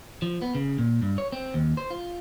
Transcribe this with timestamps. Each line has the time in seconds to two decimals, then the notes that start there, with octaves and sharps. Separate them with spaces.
0.22 F3
0.42 B3
0.55 C#3
0.78 A#2
1.02 G2
1.18 C#5
1.32 C4
1.54 D#2
1.77 C5
1.91 F4